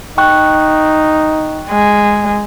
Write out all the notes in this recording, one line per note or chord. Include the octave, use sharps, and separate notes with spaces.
D#4 G5 C#6 F#6
G#3